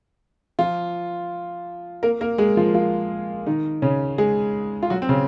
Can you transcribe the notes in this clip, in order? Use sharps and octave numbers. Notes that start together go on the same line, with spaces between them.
F3 F4
A#3 A#4
A#3 A#4
G#3 G#4
F3 F4
F3 F4
D#3 D#4
C#3 C#4
G#3 G#4
F4
F#3 F#4
C4
C#3 C#4